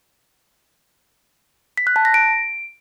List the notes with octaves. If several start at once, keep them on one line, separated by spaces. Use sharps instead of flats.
B6
F#6
A5
A#6
D7